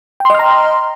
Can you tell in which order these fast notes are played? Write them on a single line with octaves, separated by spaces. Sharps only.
G5 C6 D#5 F6 A#5